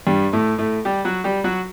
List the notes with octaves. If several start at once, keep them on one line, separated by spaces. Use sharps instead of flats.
G2 G3
A2 A3
A2 A3
G3 G4
F#3 F#4
G3 G4
F#3 F#4